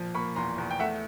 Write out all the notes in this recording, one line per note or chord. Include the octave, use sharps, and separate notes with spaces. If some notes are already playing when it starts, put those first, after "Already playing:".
Already playing: A#2 F3
A#3 B5 C#6
E2 A#5 C6
E2
G5
A3 E5 F#5